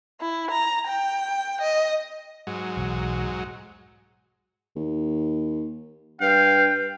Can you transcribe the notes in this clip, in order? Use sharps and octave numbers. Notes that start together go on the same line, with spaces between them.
E4
A#5
G5
D#5
G#2 F#3
B1 E2
D#2
G2 B4 F5 G5